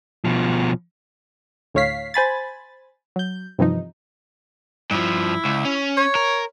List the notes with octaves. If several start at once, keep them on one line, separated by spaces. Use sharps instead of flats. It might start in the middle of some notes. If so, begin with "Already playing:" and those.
B2 F3
D2 A2 C#5 F5 B6 C7
C5 G#5 B5 A6
F#3 G6
G2 C3 E3 F3 D#4
G2 F3 E4
C#2
C#4
C#5
A#4